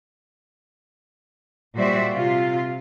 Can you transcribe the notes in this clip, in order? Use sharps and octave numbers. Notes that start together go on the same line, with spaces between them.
A#2 G3 F#4 C5 D5 E5
C3 F4